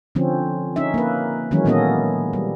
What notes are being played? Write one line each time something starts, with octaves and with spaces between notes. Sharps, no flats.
D3 F3 C4 C#4
C#4 D#4 E5
A#3 B4
D#3 E3 F#3 G#3 C#4
A#2 A#3 B3 C#4 A4 D#5
G3